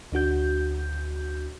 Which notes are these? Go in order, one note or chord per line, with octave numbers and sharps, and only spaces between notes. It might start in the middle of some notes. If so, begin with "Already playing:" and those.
D2 D4 F#4 G6